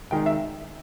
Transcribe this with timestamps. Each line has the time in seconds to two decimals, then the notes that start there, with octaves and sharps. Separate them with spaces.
0.11 D#3 G#3 D#4 G5
0.26 E5